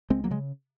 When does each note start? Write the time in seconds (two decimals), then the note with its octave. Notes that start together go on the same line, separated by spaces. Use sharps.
0.10 C#2 G#3 C4
0.24 F#3 A#3
0.31 C#3 G#3